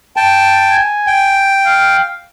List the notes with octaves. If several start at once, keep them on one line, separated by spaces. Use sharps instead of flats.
G5 A5
G#5
G5
F5